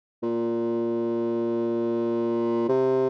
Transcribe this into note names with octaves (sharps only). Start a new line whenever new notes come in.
A#2
C3